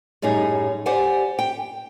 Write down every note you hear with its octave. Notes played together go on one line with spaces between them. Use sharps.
F#2 A2 G3 D#4 G#4
G4 C5 D5 F#5 G#5
G5